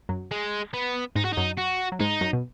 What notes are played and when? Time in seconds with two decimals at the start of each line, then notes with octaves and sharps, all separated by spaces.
0.09 F#2 F#3
0.31 G#3
0.74 B3
1.15 G#2 G#3 D#4
1.25 F#4
1.33 F#2 F#3 D#4
1.57 F#4
1.92 F#3
2.00 G#2 G#3 D#4
2.21 F#2 F#3
2.33 B2